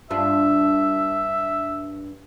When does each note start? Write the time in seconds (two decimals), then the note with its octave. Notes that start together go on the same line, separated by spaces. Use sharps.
0.10 G2 D4 F4 E5